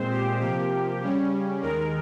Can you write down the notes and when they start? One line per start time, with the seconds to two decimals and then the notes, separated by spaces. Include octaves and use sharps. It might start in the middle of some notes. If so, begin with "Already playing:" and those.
Already playing: A#2 G#3 C4 C5
0.11 G4
0.40 C3 F3 A#3 G4
1.01 C#3 G3 C#4
1.62 D#2 D#3 G#3 A#4